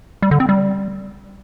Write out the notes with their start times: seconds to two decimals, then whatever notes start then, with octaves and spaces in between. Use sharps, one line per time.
0.22 G3
0.31 D3
0.40 C4
0.49 G3